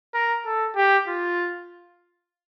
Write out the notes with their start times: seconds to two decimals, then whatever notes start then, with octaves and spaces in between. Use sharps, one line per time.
0.14 A#4
0.46 A4
0.76 G4
1.08 F4